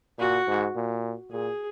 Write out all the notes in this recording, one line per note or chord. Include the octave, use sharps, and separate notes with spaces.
A#2 F#4
G#2
A#2
A#2 G#4